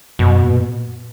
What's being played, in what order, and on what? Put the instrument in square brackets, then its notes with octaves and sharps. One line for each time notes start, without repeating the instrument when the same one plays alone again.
[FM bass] F#2 [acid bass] B2
[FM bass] A#2